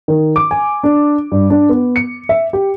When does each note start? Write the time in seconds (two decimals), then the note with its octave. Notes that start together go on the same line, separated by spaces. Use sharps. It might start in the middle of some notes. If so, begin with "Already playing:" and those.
0.08 D#3
0.36 D6
0.51 G#5
0.84 D4
1.32 G2
1.50 D4
1.69 B3
1.96 C#7
2.29 E5
2.53 G4